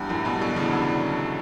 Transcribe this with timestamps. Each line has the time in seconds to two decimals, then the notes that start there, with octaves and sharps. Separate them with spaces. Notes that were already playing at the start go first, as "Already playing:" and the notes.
Already playing: E2 G2
0.09 F#2 A2
0.25 G2 B2
0.41 B2 D3
0.56 C#3 E3
0.73 D3 F#3